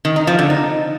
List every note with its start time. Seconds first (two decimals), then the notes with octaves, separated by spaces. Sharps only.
0.05 D#3
0.16 D#4
0.27 F3
0.39 D3
0.50 D#4